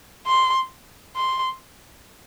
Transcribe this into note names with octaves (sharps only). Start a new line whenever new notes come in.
C6
C6